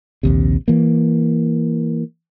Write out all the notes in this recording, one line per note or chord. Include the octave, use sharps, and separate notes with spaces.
A#1 D#2 C3
E3 A#3